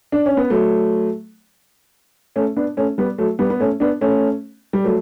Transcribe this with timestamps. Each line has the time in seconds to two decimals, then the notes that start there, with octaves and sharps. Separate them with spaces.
0.12 D4
0.26 C#4
0.37 B3
0.50 F#3 A3
2.36 A3 C#4
2.56 B3 D4
2.77 A3 C#4
2.98 G3 B3
3.18 F#3 A3
3.39 G3 B3
3.50 B3
3.60 A3 C#4
3.80 B3 D4
4.01 A3 C#4
4.73 G3
4.84 F#3 A3